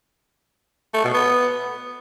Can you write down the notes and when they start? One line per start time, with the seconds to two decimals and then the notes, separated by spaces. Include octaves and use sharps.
0.94 A3
1.04 B2
1.14 B3